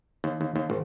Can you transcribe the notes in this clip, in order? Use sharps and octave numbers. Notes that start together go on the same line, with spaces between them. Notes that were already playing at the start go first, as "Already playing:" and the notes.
D#2
D#2
D#2
G#1